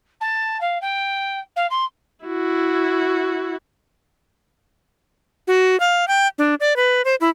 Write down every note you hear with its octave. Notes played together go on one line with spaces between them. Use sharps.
A5
F5
G5
F5
C6
E4 F#4
F#4
F5
G5
D4
D5
B4
C5
E4